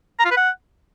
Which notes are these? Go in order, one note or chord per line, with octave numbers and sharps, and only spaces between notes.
A#5
F4
B4
F#5